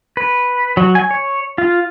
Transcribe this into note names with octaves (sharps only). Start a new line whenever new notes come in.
B4
F#3
G#5
C#5
F4